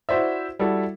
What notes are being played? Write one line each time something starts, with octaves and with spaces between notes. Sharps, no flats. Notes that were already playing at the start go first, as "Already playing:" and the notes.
E4 F#4 C5 D5 E5
G3 E4 F#4 A4